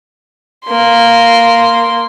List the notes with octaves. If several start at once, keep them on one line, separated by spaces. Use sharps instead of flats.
A#3 C6